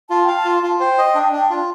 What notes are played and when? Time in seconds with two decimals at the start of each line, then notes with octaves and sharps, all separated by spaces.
0.10 F4 A5
0.24 F5 G5
0.37 A5
0.45 F4
0.63 F4
0.80 C5 G5
0.98 D#5
1.15 D4
1.32 D4
1.50 F4